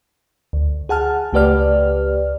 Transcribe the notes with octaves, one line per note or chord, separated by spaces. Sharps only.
D2
G#4 F#5 A5 F6
C#2 A3 G4 B4 D5 F6